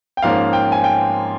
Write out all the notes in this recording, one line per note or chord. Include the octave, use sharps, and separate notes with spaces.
G5
G#2 F3 A#3 C#4 F5
G5
G#5
G5